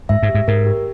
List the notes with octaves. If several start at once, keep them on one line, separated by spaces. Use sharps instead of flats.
G#2 E5
G#2
G4
G#2
G#2 A#4
G4